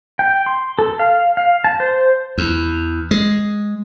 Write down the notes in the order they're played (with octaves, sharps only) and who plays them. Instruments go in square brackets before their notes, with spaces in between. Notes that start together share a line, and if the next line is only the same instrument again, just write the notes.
[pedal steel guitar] G5
C6
A4
F5
F5
A5
C5
[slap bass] E2
G#3